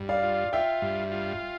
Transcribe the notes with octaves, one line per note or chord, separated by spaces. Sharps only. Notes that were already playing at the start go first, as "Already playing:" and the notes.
Already playing: G2
D5 F5
F4
F4 E5 G5
G2
F4